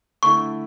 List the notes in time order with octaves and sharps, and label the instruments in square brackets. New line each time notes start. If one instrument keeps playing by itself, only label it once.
[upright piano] D3 A3 E4 [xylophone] C#6